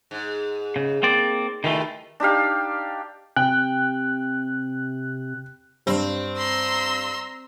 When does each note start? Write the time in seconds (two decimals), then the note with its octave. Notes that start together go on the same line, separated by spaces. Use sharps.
0.11 G#2
0.76 C#3
1.03 A#3 C4 D5
1.64 D#3 E3 G3 A3 F4
2.20 D4 D#4 G4 F5
3.36 C3 G5 F#6
5.87 G2 C4
6.37 A#5 C6 E6